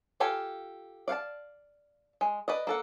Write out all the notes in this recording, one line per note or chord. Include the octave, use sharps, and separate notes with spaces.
F4 G4 A4 F5 G#5
D5 F5 F#5 A5
G#3
B4 D5 D#5
A#3 A4 F#5